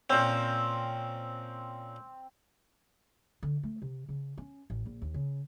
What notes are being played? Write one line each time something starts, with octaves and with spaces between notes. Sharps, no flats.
A#2 C4 C#4
D3
A3
C3
C#3
C#4
A1
A#1
D#2
C#3